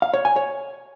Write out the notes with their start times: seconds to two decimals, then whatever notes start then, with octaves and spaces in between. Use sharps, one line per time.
0.02 F5
0.14 C#5
0.25 G#5
0.36 C#5